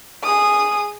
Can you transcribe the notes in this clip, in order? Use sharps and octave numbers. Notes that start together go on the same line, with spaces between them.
G#4 D#6